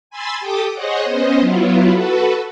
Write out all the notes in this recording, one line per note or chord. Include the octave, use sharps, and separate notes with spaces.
G#5 B5 C6 E6 A6
G4 A4 G5 D6 D#6
G#4 C5 C#5 D#5 F#5
B3 C#4 C5 D#5
F#3 B3 E4 F4
F#4 A4 B4